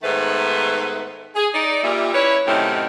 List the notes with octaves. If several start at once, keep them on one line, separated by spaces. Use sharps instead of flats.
G#2 D#3 A3 B3 B4 C5
G#4
D#4 D5
A#2 G3 E5
C#4 E4 B4 C#5
F#2 A2 C3 D#3 C4 D#4